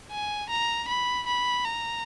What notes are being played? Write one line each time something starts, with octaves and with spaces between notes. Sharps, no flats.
G#5
A#5
B5
B5
A#5